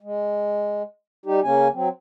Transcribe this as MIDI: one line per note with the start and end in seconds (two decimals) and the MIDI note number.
0.01 0.82 56
1.26 1.40 55
1.26 1.40 63
1.26 1.40 67
1.43 1.68 49
1.43 1.68 58
1.43 1.68 61
1.43 1.68 80
1.73 1.88 54
1.73 1.88 60